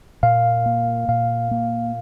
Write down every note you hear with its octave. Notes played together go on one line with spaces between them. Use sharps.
A#2 F5
A#3
A#2 F5
A#3